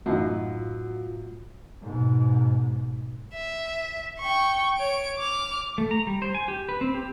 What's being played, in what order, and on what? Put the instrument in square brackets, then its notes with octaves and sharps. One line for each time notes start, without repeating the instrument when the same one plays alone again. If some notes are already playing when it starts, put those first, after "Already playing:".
[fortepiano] F#2 E3 D#4 [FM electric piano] A2 F4 F#4
[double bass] G#2 B2
[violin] E5
G5 C#6
C#5 D7
D6 F6
[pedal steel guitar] A3
A#5
G3
C5
G#5
G4
B4
C4
G4